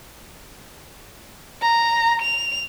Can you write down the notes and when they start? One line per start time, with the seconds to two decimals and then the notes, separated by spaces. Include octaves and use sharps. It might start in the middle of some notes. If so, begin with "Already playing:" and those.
1.62 A#5
2.22 F7